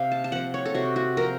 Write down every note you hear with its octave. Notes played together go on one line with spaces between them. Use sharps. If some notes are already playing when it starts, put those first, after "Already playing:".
Already playing: C3 F5
A5
A5
F3 C4 F#5
C#5
A4
C3 F#4
F#4
F3 C4 A#4